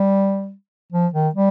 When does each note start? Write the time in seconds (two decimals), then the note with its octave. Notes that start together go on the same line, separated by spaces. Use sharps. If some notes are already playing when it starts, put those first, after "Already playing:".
Already playing: G3
0.92 F3
1.14 D#3
1.35 G3